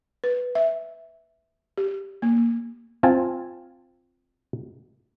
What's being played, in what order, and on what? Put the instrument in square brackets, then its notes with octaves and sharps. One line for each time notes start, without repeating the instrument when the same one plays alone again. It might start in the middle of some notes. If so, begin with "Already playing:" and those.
[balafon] B4
E5
G4
A#3
[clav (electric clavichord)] C4 F4 G#5 A5